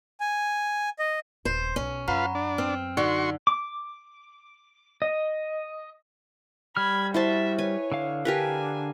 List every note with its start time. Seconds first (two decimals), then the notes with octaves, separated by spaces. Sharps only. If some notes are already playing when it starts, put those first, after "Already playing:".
0.20 G#5
0.99 D#5
1.45 D#1 C5
1.76 B1 C#4
2.08 F#2 F4 B4 F5 F#5 A#5 B5
2.35 D4
2.58 C4 F6
2.97 D3 D#4 F#4 C6 C#6
3.47 D6
5.02 D#5
6.77 G3 B5 F6 G#6
7.14 E4 F#4 C5 E5 A5
7.58 B4 C#5 G#5
7.92 D3 F5
8.25 D4 G4 A#4 B4 G#5